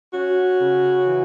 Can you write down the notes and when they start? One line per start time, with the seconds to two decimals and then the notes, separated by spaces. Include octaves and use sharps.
0.14 C#4 F#4
0.61 C#3
1.07 E3